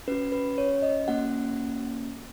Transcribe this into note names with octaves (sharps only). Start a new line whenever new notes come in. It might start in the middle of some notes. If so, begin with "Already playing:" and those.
C#4 F#4 B4
B4
C#5
D#5
A#3 C#4 F#4 F#5